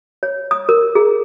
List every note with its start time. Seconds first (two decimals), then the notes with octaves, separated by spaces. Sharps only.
0.23 C#5
0.51 D#6
0.69 A#4
0.95 G#4